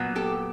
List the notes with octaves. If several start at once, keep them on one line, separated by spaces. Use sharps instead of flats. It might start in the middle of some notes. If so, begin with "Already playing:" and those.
Already playing: A#2 F#3 B3
G4 A4